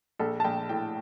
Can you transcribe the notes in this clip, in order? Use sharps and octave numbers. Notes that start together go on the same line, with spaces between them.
A#1 A4
A5
A#1 G5
A2 G5